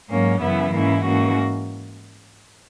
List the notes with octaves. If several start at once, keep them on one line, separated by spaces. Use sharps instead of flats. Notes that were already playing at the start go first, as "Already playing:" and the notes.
G#2 F#3 A#3 C#4
F#2 C#3 E3 B3 E4
G#2 E3 A#3 C#4 E4
G#2 E3 A#3 C#4 F#4